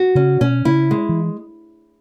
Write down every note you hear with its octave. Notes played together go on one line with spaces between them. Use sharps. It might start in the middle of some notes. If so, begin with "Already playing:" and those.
Already playing: F#4
C#3 C#4
B2 C#4
C#3 E4
G#3
E3